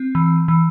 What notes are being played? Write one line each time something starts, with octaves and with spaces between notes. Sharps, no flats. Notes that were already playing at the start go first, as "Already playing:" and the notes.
Already playing: C4
E3
E3